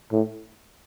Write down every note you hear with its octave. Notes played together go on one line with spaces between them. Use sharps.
A2